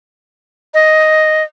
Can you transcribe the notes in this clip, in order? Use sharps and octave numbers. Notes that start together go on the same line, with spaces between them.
D#5